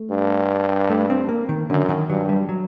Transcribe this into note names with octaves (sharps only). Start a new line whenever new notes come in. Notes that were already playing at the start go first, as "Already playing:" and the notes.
Already playing: A3
G2
A3
C4
A#3
D#3
F#2 D3
D#3
G2 F#3
G3
F#3